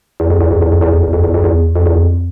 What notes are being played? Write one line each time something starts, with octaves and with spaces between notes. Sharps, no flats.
E2
F2
E2
F2
E2
F2
E2
F2
E2
F2
E2
F2
E2
F2
E2
F2